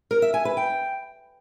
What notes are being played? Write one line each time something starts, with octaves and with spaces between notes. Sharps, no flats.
A#4
E5
G#5
B4
G5